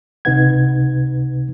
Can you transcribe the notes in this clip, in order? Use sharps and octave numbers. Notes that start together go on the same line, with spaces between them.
C#2 C3 D#4 B4 F#5 G#6